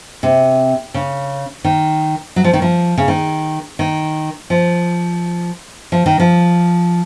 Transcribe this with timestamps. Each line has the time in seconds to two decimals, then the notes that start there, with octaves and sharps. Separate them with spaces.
0.23 C3
0.94 C#3
1.64 D#3
2.36 F#3
2.44 F3
2.53 D#3
2.62 F3
2.98 C#3
3.08 D#3
3.79 D#3
4.50 F3
5.92 F3
6.06 D#3
6.20 F3